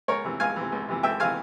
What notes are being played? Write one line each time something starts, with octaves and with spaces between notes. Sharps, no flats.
C#2 A#4 C#5
C3 E3
C#2 F5 G#5
C3 E3
C#2
C3 E3
C#2 E5 G5
C3 E3 F5 G#5